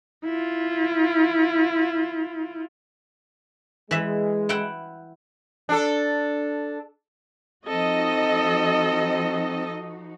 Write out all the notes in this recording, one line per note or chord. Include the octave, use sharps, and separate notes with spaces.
E4 F4
E3 G#3 E5
E4 F#5 G5
D4 A4
F3 C4 D#4 F#4 A4 D#5